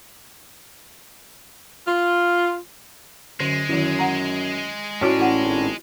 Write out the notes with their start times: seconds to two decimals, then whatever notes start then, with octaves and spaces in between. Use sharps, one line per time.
1.88 F4
3.40 F#2 D3 G#3
3.69 F#2 D#3 E4
3.99 F#5 A#5
5.01 A2 C#4 E4 F#4 C#5 D5
5.18 A1 E4 F#5
5.45 G#1